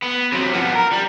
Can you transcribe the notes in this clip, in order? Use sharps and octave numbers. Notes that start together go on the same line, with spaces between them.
B3
C3 F#3
F3 B3
A#4
G3